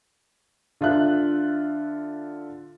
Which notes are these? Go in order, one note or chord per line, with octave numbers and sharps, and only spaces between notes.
D3 F4 E5 F#6